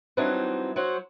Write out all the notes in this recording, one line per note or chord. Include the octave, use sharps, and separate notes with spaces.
E3 F#3 G3 C4 D4 D#4
F#3 F#4 C5